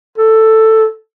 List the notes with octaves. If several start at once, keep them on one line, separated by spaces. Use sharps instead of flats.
A4